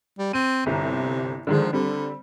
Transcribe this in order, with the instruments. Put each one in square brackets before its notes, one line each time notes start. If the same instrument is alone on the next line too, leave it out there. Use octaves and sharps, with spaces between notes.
[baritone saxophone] G3
[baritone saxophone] C4 [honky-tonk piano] D#7
[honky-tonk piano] G1 C2 [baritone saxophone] C3
[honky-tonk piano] D3 D#3 G#3 [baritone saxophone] F3
[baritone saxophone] D3 [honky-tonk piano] G3 C4